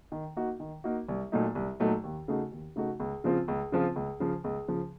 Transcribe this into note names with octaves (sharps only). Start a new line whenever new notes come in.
D#3
A#3 D#4 F#4
D#3
A#3 D#4 F#4
C2
A#2 F#3 A3 D#4
C2
A#2 F#3 A3 D#4
D#2
C#3 A3 D#4 F#4
D#2
C#3 A3 D#4 F#4
C#2
C#3 F3 C4 F4
C#2
C#3 F3 C4 F4
C#2
C#3 F3
C#2
C#3 F3